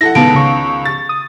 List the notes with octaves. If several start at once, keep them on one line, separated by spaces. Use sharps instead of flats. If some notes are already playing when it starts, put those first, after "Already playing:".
E4 A4 F#5 A#6
C#2 D#3 B3 A5 D7
C#3 C#6
A6
D#6